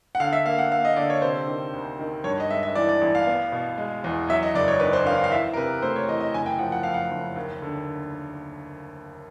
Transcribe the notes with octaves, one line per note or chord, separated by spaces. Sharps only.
F#5
D3 F5
E5
A#3 F5
F#5
A#3 F5
D#5
D3 D5
C#5
C3 C5
D#3
D2
D#3
G2 C#5
D#5
G#3 E5
E5
E3 D5
D5
A1
F5
B3
B2
G#3
E2
F#3 E5
D#5
F#1 D5
C#5
D#3 B4
C5
D#3 F5
F5
E3 E5
A#4
C3 B4
A3 C5
C#5
E3 D#5
D#5
F#1 G#5
G5
F3 F#5
F#5
F2 F5
F#5
F#1
D#2
D3